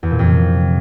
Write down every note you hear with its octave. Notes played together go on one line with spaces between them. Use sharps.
E2
A#2
F2
C3